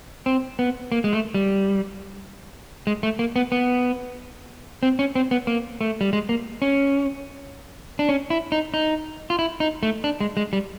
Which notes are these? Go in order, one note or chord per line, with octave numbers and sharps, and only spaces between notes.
C4
B3
A#3
G#3
A3
G3
G#3
A3
A#3
B3
B3
C4
C#4
C4
B3
A#3
A3
G3
G#3
A#3
C#4
D4
C#4
E4
D#4
D#4
F4
E4
D#4
A3
D4
G#3
G#3
G3